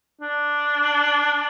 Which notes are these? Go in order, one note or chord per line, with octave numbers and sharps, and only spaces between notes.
D4